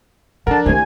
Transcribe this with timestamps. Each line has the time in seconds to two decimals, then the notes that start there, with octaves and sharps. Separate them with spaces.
0.47 F3 D4 A4 A#4 F#5 A5
0.66 C2 D#3 A3 G#5